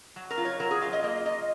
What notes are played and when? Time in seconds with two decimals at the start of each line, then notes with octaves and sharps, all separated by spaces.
0.16 F#3
0.30 A#4
0.37 F4
0.45 C#5
0.60 F#3 A#4
0.71 G#4
0.81 F4 F5
0.93 D#5
1.04 A#3 D#5
1.26 F4 D#5